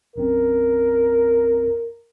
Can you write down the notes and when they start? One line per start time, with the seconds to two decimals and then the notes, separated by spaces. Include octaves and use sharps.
0.16 B1 F#2 C4 A#4